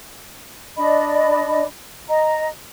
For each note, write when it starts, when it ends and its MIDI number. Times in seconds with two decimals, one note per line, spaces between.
0.77 1.64 62
0.77 1.64 74
0.77 1.64 75
0.77 1.64 83
2.08 2.48 75
2.08 2.48 82